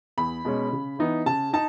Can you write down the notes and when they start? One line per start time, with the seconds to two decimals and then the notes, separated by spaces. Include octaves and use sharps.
0.17 E2 B5
0.45 B2 G#3 C#4
0.72 C#3
0.99 E3 B3 D#4
1.26 C#3 A5
1.53 D#4 A5